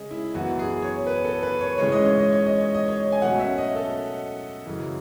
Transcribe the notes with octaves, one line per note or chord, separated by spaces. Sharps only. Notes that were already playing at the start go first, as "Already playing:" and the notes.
Already playing: C#3 G#3 C#4 G#4 D#5
E4
F#2 E3 B3 F#4
G#4
C#5
B4
A4
B4
C#5
G#2 E3 G#3 C#4 C#5
D#5
C#5
D#5
C#5
D#5
C#5
D#5
C#5
G#5
B2 F#3 A3 C#4 F#5
E5
D#5
A4
F#2 C#3 E3